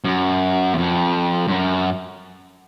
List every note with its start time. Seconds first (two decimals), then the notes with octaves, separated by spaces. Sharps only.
0.04 F#2
0.73 E2
0.78 F2
1.48 G2
1.51 F#2